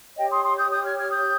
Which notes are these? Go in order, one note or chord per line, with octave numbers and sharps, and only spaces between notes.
G4 C#5 D#5 G5
C6 D#6
C6 D#6
D#6 G6
D#6 G6
F6 G#6
F6 G#6
D#6 G6